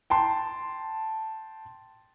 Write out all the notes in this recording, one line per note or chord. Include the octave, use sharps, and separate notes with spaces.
G5 A5 C6